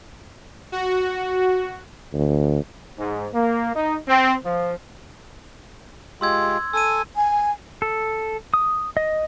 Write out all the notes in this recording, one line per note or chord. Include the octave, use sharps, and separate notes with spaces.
F#4
D2
G#2
A#3
D#4
C4
F3
G#3 F4 G4 C6 E6 G#6
A4 G#5 E6 D#7
G#5
A4
D#6
D#5